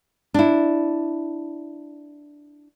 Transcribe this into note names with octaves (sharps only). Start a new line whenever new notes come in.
D4 E4